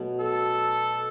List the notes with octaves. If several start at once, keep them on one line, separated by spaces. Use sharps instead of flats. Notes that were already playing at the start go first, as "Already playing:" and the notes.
Already playing: B2 F#3 A3
A4